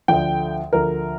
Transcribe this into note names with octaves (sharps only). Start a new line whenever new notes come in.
D2 D3 F3 G5
D2 D3 F3 A#4